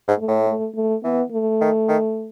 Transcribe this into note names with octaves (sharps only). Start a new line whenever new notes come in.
G#2
A3
A2
A3
A3
E3 B3
A3
D#3
D#3